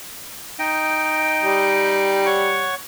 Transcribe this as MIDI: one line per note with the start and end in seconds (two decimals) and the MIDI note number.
0.59 2.26 63
0.59 2.26 75
0.59 2.26 79
1.42 2.71 55
2.26 2.75 73
2.26 2.75 78
2.26 2.75 85